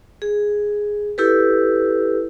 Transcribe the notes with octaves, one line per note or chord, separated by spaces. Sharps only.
G#4
E4 G4 A4 B4